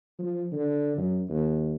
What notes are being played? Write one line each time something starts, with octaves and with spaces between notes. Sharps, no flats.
F3
D3
F#2
D#2